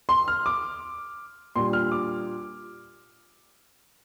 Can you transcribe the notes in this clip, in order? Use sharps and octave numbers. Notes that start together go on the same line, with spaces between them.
C6
F6
D6
A#2 G3 D4 C6
F6
D6